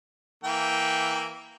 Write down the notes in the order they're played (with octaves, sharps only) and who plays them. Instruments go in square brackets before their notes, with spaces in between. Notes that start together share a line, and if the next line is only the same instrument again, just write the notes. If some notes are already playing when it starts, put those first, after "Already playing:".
[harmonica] E3 A#3 G5